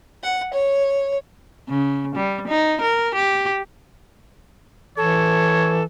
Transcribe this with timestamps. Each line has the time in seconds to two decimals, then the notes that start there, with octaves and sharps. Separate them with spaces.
0.23 F#5
0.53 C#5
1.69 C#3
2.16 G3
2.48 D#4
2.82 A#4
3.16 G4
4.97 E3 A4 C#5